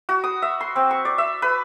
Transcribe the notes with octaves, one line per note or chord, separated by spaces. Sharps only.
F#4
D#6
E5
C6
C4
C#6
D5
E5
B4